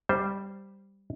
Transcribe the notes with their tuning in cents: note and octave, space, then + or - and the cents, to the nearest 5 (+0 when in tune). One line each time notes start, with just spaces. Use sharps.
G3 +0 C5 +0